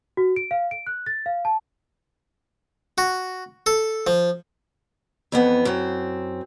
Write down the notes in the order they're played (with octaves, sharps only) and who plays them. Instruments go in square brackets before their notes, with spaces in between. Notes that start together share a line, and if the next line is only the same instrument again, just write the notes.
[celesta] F#4
D7
F5
D7
F#6
A6
F5
A5
[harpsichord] F#4
A4
F3
[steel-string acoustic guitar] F2 E3 B3
F#2 C4